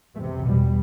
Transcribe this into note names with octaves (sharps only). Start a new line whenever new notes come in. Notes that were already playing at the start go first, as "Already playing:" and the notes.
E2 A3
C3
E2 B2 G3